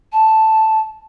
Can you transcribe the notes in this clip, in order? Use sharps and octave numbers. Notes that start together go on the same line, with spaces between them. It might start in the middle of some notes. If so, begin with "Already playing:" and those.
A5